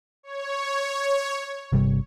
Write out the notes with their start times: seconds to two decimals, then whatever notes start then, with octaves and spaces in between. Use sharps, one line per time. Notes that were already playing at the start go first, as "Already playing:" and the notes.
0.23 C#5
1.72 G1 C3 G3